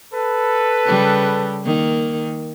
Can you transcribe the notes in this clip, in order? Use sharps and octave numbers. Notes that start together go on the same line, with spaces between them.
A4 B4
C#3 G3
D#3 A#3